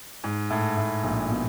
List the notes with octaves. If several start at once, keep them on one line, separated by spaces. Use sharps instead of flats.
G#2
A2
A2
A#1 A#2
B2